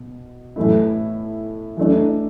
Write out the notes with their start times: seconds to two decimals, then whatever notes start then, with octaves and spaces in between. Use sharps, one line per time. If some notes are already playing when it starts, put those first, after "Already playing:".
Already playing: B2
0.56 A2 E3 A3 E4
1.77 E3 A3 D4